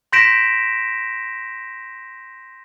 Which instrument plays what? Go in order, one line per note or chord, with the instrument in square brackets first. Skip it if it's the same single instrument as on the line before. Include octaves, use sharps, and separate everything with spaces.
[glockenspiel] C6 G6 A#6 B6 D7 E7